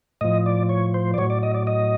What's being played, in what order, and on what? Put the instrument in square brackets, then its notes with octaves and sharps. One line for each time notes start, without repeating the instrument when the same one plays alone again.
[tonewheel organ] A2 F3 D#5
D5
C#5
C5
D5
A2 F#3 C#5
D5
D#5
D5
D#5